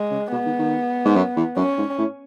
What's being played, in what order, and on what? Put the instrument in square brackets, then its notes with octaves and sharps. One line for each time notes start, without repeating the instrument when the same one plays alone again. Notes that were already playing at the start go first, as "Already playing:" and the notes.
Already playing: [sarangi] G#3
[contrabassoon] C#3
[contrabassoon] B2 [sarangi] B3
[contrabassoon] D#3
D#3
G#2
F#2
E2
[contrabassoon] F#2 [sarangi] C#4
[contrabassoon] G#2
A2